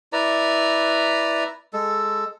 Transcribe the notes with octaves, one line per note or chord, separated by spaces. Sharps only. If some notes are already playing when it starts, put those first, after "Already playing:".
E4 B4 D5 A#5
G#3 A4